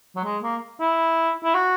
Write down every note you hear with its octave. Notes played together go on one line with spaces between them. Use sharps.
F#3
G#3
A#3
E4
E4
F#4